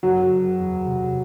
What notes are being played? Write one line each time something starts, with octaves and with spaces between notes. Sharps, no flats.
F#1 F#3
F#1
E2
C3